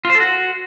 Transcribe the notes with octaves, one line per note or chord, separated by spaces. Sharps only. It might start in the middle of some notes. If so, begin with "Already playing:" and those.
F4
C5
A4
F#4